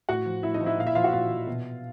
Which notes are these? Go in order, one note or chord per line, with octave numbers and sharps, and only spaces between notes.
A2 F#4 F#5
F3
A2 E4 E5
D#4 D#5
F3
E4 E5
A#2 F5
E4 E5
F3 F4 F5
F#4 F#5
A#2 F4 F5
F3
B2